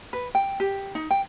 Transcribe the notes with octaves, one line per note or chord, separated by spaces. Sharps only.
B4
G5
G4
D#4
G5